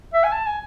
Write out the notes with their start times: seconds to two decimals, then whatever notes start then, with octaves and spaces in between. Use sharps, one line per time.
0.14 E5
0.24 G#5
0.33 A5
0.47 G#5